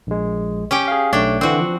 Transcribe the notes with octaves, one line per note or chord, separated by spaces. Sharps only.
A#1 G#3
C#4 G4 G5
G#4 F5
B1 A3 D4 C#5 G5
D3 E3 C4 F#4
F3